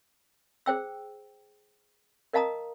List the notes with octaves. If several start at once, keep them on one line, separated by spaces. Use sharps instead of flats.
G#4 C5 G5 E6
A#4 D#5 F5 A5 A#5 D#6